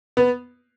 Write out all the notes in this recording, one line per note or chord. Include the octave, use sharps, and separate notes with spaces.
B3